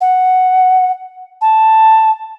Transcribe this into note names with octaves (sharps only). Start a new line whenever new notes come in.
F#5
A5